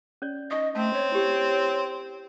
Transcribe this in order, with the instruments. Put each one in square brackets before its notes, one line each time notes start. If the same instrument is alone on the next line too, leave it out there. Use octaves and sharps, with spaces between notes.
[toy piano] C#4 C#5 D5
[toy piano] D#4 C#6 D#6 [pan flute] D#5
[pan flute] A3 [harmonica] C4 [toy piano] A5
[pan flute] C#5
[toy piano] E4 G4